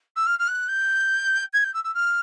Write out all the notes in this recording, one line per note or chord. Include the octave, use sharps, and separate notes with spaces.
E6
F6
F6
F#6
G6
G#6
G6
E6
E6
F6